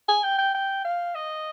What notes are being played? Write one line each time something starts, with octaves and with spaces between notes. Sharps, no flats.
G#5
G5
G5
G5
F5
D#5